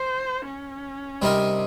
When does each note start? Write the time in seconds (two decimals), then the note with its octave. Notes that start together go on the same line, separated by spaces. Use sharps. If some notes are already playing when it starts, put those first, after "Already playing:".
Already playing: C5
0.45 C#4
1.22 C3 G3 C4 D#4 A#4